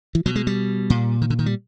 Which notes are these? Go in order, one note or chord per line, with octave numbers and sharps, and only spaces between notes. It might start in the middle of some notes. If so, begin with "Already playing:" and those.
E3
B2 F#3
G#3
G3
A#2
D#3
D3
D#3
G3